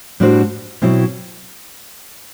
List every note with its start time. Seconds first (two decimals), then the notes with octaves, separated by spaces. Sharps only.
0.20 A2 G3 D4 F#4 C5
0.82 B2 F#3 C4 E4